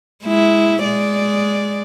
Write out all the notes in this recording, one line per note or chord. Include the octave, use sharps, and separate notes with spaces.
G#3 E4
G#3 D5